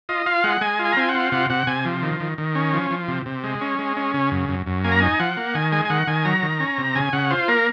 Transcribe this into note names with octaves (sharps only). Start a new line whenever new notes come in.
F4 D#5
F4 F5
G#3 F#5
G#3 G#5
F4
G#5
A#5
C4 G#5
F#5
F4
C3 F#5
C3 F#5
C3 G#5
F3
D#3
D#3
D#3
C#4
F3
F3
C3
C3
G#3
C#4
G#3
C#4
C#3
F#2
F#2
F#2
A#3 G#5
A#5
D#4 G#5
F3 F#5
A#3
D#3 G#5
G#3 G#5
G#5
D#3 F#5
D#3 G#5
F#3 A#5
D#3
C#4
C3
C#3 G#5
C#3 F#5
F4 C5
A#3 A#4